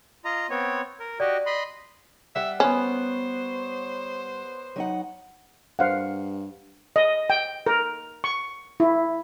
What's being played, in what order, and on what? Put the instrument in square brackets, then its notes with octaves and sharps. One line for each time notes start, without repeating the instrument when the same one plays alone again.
[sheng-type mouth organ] F4 D#5 A#5
B3 C4 C#5
A#4
[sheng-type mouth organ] F#4 G4 D#5 [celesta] D5
[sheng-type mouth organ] D#5 B5 C6
[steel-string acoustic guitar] G3 [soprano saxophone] E5 [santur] F#5
[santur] B3 C#5 [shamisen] C#4 [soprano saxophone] C5
[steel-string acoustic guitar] F#3 D#4 F#5
[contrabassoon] G2 [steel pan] C5 F5 F#5
[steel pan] D#5
G5
A#4
C#6
E4